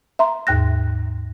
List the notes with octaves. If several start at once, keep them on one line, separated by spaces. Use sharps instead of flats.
E5 A#5 C6
D#2 G#2 G5 F#6 A#6